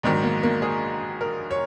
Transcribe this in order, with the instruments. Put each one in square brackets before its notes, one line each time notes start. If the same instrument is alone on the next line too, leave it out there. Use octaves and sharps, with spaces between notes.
[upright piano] A#1 G#2 D#3 F#3 G#3
A#3
A#3
G#4
A#4
C#5